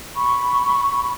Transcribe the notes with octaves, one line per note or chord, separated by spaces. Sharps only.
B5 C#6